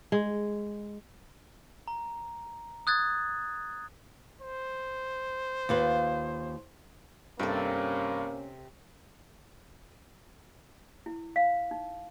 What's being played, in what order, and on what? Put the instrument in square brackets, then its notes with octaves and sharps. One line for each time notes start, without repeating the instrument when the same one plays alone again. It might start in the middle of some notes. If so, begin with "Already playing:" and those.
[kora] G#3
[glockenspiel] A#5
D#6 F#6 G#6 A6
[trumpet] C5
[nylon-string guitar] D#2 F4 B4
[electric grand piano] G2 [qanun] C3 A4 [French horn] A#3 [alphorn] C#4
[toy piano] E4
F5
D#4